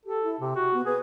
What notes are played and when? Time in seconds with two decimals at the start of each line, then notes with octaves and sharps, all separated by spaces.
0.06 G4 A4
0.23 E4
0.40 C3 G4
0.56 F#4
0.74 B3
0.86 G#4 B4